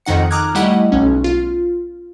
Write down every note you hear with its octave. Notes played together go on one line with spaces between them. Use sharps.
F2 D#3 D#4 F#5 C#7
A#5 D6 D#6 F6 F#6 G#6
G3 A3 E4 D#5 F#5
B1 C#4
F4